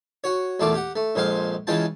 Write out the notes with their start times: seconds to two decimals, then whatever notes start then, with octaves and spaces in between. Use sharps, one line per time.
0.24 F#4 C#5
0.60 E2 A#2 A3 F4 D6
0.74 G4 F#5
0.96 A3
1.15 A#1 F2 G#3 C5 F5
1.67 C#3 E3 G#3 F4 G5 A5